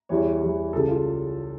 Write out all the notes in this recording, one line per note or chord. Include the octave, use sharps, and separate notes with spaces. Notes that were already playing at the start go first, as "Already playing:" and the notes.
E2 E3 G3 C#5
E2 E3 G3
C#2 C#3 G3 A4
F4